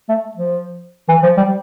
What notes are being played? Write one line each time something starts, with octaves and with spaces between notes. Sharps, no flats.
A3
F3
E3
F3
G3